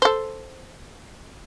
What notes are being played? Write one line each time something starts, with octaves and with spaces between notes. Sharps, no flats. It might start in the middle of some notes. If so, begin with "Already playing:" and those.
A4 C5